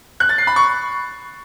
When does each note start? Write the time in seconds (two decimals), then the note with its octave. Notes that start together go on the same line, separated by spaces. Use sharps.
0.20 F#6
0.29 A6
0.38 C7
0.47 B5
0.56 C#6